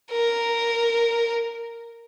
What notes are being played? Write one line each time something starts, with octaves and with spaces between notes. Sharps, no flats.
A#4